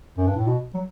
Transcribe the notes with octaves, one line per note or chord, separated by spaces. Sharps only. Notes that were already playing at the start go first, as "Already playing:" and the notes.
F#2
G2
A2
B2
F#3